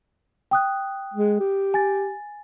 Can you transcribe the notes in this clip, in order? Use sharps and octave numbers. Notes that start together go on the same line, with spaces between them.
G5 D#6 F#6
G#3
G4
G#5 A6